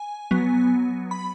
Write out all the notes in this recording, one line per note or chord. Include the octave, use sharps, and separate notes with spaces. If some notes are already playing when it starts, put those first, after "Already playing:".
Already playing: G#5
F#3 B3
B5